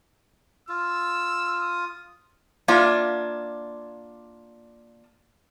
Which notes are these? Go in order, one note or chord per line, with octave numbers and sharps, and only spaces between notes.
F4 E6
D#6
A#3 D4 F4 E5